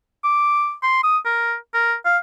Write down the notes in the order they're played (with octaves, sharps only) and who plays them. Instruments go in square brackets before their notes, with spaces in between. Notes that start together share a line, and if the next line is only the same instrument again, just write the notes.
[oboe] D6
C6
D#6
A#4
A#4
F5